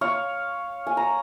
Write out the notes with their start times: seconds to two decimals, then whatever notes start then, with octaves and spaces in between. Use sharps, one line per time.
0.01 C#5 F5
0.87 G#5
0.97 A#5